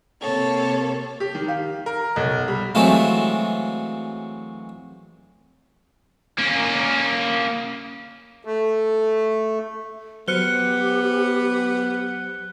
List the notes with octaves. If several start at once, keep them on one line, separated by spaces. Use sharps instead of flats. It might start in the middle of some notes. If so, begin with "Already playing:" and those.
C3 A#3 A4 C#5
G4
D#3
F5
A#4
B1
G3
E3 F#3 G#3 A3 C4 F4
A#3 C#4
A3
F#3 B3 G4 C5 F6 F#6 C#7 G7